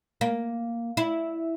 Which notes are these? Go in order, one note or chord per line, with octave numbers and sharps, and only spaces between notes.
A#3
E4